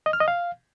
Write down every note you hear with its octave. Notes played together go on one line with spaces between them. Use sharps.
D#5
F6
D#5
F5